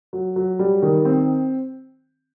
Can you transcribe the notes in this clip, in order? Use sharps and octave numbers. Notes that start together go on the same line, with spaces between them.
F#3
F#3
G3
D#3
C4